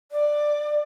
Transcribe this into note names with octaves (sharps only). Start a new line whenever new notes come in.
D5